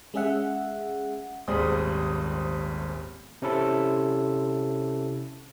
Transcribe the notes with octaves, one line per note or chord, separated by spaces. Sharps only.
G#3 C#4 G#4 E5 F#5
D#1 G#1 G3 G#4 C5 D#6
C3 C#4 E4 A4